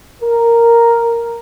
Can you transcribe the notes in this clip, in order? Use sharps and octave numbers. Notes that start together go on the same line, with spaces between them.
A#4